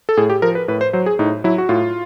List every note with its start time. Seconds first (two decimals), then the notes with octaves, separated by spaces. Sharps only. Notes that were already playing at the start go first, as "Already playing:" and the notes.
0.09 A4
0.17 A2 G#4
0.30 G4
0.42 F3 A#4
0.55 B4
0.68 A2 B4
0.81 C5
0.93 F#3 C5
1.06 G#4
1.19 A2 D#4
1.44 F#3 E4
1.58 F#4
1.69 A2 F4